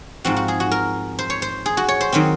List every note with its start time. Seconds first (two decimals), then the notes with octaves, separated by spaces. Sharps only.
0.25 G#2 F3 C4 F#4
0.36 F#4
0.48 G#4
0.60 F#4
0.71 A#4
1.19 C5
1.30 C#5
1.42 C5
1.66 G#4
1.77 F#4
1.89 C#5
2.01 C5
2.12 D#3 F#3 C4